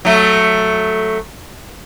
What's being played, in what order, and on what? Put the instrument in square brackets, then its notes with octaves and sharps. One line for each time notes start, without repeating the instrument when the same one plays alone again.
[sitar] F#3 A3